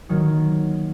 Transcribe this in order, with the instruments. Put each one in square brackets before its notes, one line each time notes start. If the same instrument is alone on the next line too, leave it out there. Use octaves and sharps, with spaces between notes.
[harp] D#3 F#3 A#3 D#4